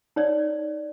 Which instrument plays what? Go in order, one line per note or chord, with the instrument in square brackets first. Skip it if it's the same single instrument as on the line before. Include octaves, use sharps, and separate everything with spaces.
[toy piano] D#4 C#5 D5